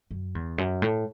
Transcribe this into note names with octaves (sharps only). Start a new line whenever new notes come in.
F#2
E2
F#2
A2